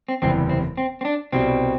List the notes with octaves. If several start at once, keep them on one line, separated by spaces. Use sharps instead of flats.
C4
F#1 E2 C3 E3 G3 C4
C4
C4
C4
D4
C2 B2 G3 C4